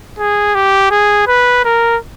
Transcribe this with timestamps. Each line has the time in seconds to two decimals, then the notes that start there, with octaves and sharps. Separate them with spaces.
0.19 G#4
0.55 G4
0.91 G#4
1.27 B4
1.65 A#4